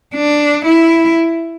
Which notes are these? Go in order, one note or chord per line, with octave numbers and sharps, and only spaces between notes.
D4
E4